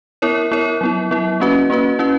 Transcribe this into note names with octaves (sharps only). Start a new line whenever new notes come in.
B3 E4 A#4 C#5
B3 E4 A#4 C#5
F#3 B3 E4
F#3 B3 E4
A#3 C#4 F#4 B4
A#3 C#4 F#4 B4
C#4 E4 B4